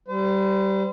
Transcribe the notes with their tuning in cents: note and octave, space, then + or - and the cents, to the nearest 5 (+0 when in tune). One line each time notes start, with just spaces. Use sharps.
G3 -15 C5 -40